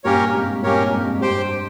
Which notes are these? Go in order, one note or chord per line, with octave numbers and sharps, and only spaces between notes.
G2 A#2 A#3 C#4 G4 A#4 C#5
G#2 C3
G2 A#2 A#3 C#4 G4 A#4 C#5
F2 G#2
G2 G4 C5 G5